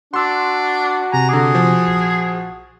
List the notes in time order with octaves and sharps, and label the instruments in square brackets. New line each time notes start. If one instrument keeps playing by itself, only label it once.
[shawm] D4 [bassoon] F#4 [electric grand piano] C6 E6
[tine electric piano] C3 G#5 [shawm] A#5
[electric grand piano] D3 D6 [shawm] G#4
[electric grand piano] F3
[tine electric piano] A#1